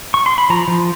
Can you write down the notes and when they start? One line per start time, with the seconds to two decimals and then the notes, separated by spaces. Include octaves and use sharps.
0.14 C#6
0.26 C6
0.38 B5
0.50 F3 A#5
0.68 F3